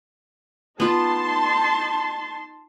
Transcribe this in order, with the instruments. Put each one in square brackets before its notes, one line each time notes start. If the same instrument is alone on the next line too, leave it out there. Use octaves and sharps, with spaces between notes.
[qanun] B3 F4 [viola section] D#4 A5 C6